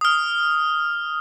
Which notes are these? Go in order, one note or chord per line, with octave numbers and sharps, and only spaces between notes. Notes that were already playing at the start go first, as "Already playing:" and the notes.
D#6 F6